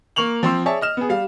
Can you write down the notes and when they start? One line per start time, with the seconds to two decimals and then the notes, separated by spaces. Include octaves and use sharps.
0.16 A#3 A#4 C#6 F7 F#7
0.43 F3 C4 C6 E6
0.66 G#4 C#5 D5 E5 A5
0.81 D#5 F6 E7
0.97 B3 G#4
1.09 G3 F5